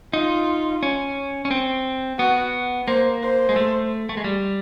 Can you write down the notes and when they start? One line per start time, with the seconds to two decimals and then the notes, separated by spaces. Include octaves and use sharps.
0.13 D#4 F4
0.83 C#4
1.45 C#4
1.51 C4
2.19 B3 F#4
2.88 A#3 C5
3.23 C5
3.49 G#3
3.56 A3
4.09 A3
4.17 G#3
4.24 G3